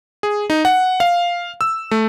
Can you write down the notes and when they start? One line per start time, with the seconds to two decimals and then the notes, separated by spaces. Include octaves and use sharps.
0.23 G#4
0.50 D#4
0.65 F#5
1.00 F5
1.61 E6
1.91 A3